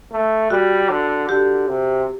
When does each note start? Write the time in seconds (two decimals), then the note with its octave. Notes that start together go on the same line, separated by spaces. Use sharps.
0.12 A3
0.50 G3 F#4
0.90 D3
1.29 D3 G4
1.68 C3